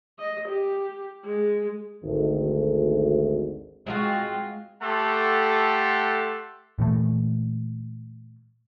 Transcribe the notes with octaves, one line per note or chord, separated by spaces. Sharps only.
D#5
G4
G#3
G#1 D2
G#3 C4 D#4 F4 F#4
A3 G4 A4 F#5 A5 C6
A#2 E3 A3